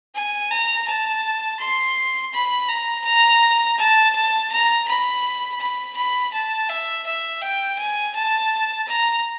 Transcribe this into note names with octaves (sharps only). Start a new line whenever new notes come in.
G#5
A#5
A5
C6
B5
A#5
A#5
A5
A5
A#5
B5
B5
B5
A5
E5
E5
G5
G#5
A5
A#5